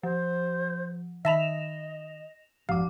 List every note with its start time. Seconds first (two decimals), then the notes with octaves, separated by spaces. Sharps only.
0.03 F3 C5
1.25 D#3 D#5 E5 A5 B5 A#6 E7 F7
2.69 G#1 F2 F3 D4 F5 D6